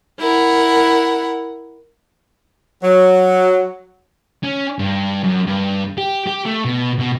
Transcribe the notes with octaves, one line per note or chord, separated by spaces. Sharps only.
E4 A#4 F#5
F#3
C#4
G2
F#2
G2
G4
G4
A3
B2
B2